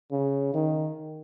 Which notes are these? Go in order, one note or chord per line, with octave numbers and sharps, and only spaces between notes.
C#3
D#3